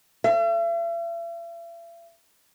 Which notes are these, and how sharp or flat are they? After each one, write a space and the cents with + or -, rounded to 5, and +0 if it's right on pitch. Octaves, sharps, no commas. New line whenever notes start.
E5 +45